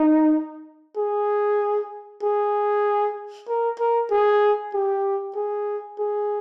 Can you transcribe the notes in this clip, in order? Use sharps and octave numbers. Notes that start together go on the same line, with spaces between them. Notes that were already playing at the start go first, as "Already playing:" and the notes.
Already playing: D#4
G#4
G#4
A#4
A#4
G#4
G4
G#4
G#4